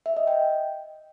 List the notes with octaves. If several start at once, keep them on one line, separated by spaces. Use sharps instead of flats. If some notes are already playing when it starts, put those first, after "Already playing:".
E5
D#5
G5